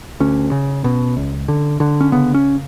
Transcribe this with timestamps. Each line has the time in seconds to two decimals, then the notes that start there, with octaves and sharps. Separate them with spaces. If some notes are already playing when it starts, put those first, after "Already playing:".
0.20 D2 C#4
0.52 C#3
0.84 B2
1.17 C#2
1.48 D3
1.80 D3
2.01 C#4
2.12 C#3 B3
2.34 C#4